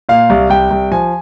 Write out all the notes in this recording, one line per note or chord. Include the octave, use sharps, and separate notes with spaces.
A#2 F5
C2
C2 G5
C2
F3 G#5